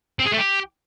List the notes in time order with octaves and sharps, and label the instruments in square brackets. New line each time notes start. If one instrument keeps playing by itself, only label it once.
[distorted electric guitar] C4
G#4
A3
G4